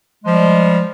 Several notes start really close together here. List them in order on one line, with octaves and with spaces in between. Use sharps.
G#3 F3 G3